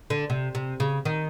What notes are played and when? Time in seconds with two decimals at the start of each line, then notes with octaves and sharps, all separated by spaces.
0.10 D3
0.30 C3
0.55 C3
0.80 C#3
1.05 D#3